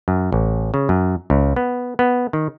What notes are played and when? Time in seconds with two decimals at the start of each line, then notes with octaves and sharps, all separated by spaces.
0.08 F#2
0.32 A1
0.74 C#3
0.89 F#2
1.30 C#2
1.56 B3
1.99 B3
2.33 D#3